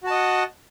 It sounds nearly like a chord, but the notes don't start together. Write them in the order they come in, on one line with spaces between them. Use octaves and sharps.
F#4 A5 D#5 F#5